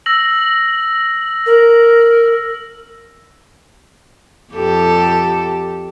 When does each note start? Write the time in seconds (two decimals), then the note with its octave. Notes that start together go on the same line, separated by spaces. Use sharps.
0.06 E6 A#6 F#7
1.46 A#4
4.53 F2 G4 A4